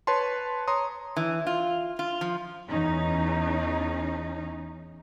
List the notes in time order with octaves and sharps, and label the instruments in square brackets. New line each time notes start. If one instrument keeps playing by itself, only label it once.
[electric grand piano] B4 C#5 A5 C6
C#5 A#5 C6 D#6
[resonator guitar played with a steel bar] E3
F4
F4
F3
[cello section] E2 C#4 D#4